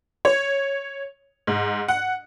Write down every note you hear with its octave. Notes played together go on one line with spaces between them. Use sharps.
C#5
G#2
F#5